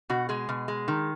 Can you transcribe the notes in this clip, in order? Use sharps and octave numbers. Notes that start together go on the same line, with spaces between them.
B2 F#4
G#3 G#4
B2
G#3
D#3